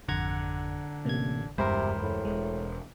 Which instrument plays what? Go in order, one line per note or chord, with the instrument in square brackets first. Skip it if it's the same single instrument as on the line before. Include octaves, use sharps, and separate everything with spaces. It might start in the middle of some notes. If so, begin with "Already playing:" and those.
[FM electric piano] G#1 F2 [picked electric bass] D3 [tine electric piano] F#5 A#5 G#6
[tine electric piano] A1 G#6 [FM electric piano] C3 A#3
[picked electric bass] F#1 E2 G#3 [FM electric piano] G2 B5 [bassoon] C3 [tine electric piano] A#4 C5
[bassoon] A2
[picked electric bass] E1 [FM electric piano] G#3